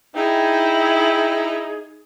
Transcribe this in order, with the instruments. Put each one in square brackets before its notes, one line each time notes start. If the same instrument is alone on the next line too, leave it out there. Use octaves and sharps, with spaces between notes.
[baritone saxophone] D#4 [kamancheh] E4 [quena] G#4 [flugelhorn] G5